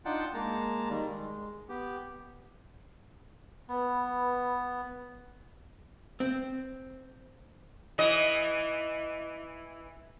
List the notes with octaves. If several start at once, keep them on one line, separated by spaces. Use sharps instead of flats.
D4 D#4 F4 F#5 G5 A5
G#3 A#3 A5 A#5
D#3 G3
G#3
B3 G4
B3 B4 B5
C4
E3 D#5